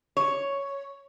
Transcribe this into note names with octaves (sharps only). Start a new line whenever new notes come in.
C#5